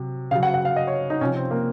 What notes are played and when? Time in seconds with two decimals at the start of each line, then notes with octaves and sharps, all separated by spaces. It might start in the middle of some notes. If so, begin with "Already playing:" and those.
Already playing: C3 F#3
0.31 C#3 F#3 F5
0.43 F#5
0.54 F#5
0.65 F5
0.76 D#5
0.87 C#5
1.10 D#4
1.21 C3 F3 C#4
1.36 C4
1.51 A#3